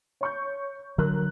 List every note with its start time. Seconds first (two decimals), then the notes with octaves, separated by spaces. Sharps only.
0.21 C#5 C#6 G6
0.98 D3 F#3 A#4 F#6